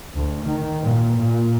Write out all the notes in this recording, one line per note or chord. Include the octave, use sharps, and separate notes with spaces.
D2
D#3
A#2
A#2